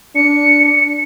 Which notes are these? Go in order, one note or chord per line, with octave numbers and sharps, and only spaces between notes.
D4 C#7